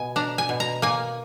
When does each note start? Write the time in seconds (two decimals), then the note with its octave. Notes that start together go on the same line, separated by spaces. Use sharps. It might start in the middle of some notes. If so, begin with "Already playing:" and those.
Already playing: B2 G#5
0.16 D4 A#5
0.38 G#5
0.49 B2
0.60 A#5
0.82 A#3 G#5